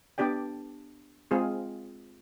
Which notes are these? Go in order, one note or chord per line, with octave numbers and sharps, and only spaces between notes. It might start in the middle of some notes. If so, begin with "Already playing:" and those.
B3 D4 G4 D5 G5
G#3 C4 F4 G#4